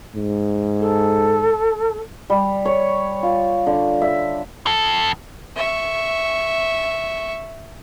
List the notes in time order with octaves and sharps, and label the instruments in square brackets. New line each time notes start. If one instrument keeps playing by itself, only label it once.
[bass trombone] G#2
[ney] A4
[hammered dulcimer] G3
C#5
F4
D3
E5
[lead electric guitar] F2 A4
[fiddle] E5 C#6